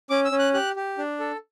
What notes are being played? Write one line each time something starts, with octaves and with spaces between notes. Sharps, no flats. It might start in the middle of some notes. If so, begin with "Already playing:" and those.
C#4 D6
E6
C#4
F#6
G4 F#6
G4
D4
A4